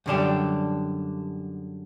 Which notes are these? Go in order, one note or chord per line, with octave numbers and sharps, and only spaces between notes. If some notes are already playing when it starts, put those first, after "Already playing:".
F#2 D3 G3 D4 G4